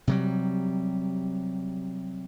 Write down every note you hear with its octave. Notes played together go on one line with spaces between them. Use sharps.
C3 F#3 G3